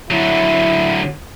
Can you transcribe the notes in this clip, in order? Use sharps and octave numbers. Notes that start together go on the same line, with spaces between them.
D3 F#3 E4